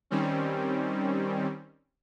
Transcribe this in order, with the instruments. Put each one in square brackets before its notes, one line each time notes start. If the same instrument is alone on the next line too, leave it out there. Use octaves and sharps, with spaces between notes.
[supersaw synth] D#3 G3 C4 C#4